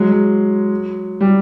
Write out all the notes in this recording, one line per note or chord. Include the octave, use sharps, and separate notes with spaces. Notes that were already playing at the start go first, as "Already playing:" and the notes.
Already playing: F#3 G#3
F#3
G3